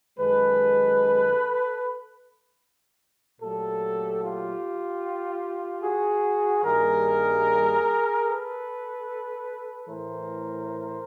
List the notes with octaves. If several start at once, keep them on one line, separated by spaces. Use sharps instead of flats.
F#2 D#3 G#3 A4 B4
A#2 F#3 A3 G4 A4
F4 G4
F#4 G#4
G2 D#3 G3 A#3 G#4 A#4
A4 B4
A2 E3 A3 A#4 C5